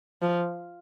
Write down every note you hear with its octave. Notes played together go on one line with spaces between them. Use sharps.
F3